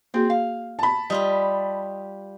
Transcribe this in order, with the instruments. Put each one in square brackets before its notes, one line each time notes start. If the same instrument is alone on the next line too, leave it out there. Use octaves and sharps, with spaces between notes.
[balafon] A#3 F#4 G#4 [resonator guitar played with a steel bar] C4
[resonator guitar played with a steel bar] F5
[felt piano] A5 B5
[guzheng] G3 F4 G4 [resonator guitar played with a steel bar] D#5